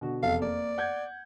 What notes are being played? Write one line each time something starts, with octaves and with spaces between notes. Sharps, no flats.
B2 D3 F#4
F1 E2 A4 F5
A#3 D5
F#5 G6 G#6